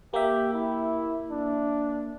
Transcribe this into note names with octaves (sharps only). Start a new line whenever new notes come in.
A#3 G4 E5
E4
D4